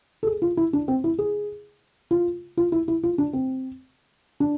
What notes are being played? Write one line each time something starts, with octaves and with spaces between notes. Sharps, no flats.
A4
G#4
F4
E4
D4
C4
E4
G#4
F4
F4
E4
E4
F4
D4
C4
D4